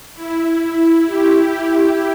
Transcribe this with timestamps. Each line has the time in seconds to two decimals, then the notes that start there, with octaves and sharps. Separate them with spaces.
0.14 E4
1.06 G4